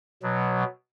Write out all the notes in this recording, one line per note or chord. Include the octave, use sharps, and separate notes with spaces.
B2 F#3